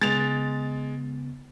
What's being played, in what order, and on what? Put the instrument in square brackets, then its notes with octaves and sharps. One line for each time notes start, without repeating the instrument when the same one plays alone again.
[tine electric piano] C#3 B3 [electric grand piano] G#3 [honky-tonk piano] A6 F7